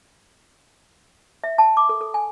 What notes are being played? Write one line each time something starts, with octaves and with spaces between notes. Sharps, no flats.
E5
A5
D6
A4
A4
G#5